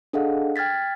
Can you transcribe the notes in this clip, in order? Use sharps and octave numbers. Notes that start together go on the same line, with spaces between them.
D4 G#4 A4 D#5 F5 F#5
G5 F6 G#6 A6 B6